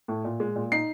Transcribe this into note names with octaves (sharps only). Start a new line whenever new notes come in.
A2
A#2
G#3
A#2
D#4 C7